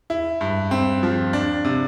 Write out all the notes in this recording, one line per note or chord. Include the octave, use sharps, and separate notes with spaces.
E4
G2
C4
F3
D4
C3